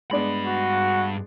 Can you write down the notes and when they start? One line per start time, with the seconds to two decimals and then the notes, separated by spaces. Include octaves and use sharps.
0.11 G2 G#3 B3 D4 B5
0.45 F#4